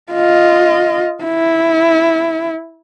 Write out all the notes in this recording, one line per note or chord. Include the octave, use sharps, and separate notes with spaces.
F4 D#5
E4